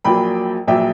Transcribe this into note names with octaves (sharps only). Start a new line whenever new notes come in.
A#1 A#2 F#3 A#3 G5 B5
A#1 A#2 F#3 E5 G5